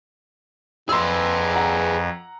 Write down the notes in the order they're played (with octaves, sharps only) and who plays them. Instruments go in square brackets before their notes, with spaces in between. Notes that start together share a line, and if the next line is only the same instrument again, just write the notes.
[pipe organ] F2 [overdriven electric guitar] G#4 B4 [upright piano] C6 E6
[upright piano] F#5 A#5